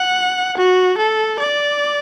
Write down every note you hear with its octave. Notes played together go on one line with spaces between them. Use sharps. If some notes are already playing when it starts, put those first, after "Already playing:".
Already playing: F#5
F#4
A4
D5